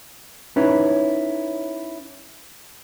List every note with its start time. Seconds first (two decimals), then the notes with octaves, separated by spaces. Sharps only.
0.56 C#4 D#4 E4 B4 C#5